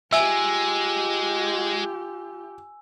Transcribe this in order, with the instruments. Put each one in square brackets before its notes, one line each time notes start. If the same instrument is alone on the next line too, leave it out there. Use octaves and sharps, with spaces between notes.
[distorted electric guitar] G#3 [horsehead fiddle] F4 G4 [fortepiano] E5 [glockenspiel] G#5 E6